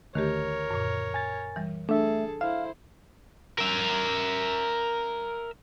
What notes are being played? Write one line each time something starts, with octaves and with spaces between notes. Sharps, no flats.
D2 D#3 A3 G4 A#4 C#5
F#2 A#2
G#5 A6
E3 G3
A3 D4 G#4 A4 E5
E4 C5 E5 F5
A#4 E5